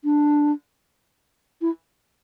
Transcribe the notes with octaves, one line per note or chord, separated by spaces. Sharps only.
D4
E4